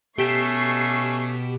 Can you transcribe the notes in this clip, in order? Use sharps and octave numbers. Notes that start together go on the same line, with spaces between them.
B2 A3 C#4 G4 C#6 B6 C7 E7